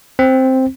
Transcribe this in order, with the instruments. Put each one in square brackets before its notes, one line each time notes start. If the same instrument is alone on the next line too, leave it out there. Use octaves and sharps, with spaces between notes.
[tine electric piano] C4